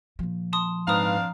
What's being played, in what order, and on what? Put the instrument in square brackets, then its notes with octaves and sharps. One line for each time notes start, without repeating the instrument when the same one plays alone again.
[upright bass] A#2 F3
[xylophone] A5 C6 D#6
[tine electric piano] G#2 B4 [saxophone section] C4 D4 F5 [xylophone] A#5 D#6